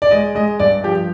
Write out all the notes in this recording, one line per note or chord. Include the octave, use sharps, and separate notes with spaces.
D5
G#3 D#5
G#3 D#5
G2 D5
F3 G4